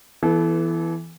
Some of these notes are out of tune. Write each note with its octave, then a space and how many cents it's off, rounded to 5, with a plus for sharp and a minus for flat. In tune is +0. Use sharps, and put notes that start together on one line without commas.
E3 +10 B3 +0 A4 -35